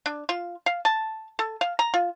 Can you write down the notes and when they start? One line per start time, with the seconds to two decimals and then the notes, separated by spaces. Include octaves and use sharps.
0.06 D4
0.29 F4
0.66 F5
0.85 A5
1.39 A4
1.61 F5
1.79 A#5
1.94 F4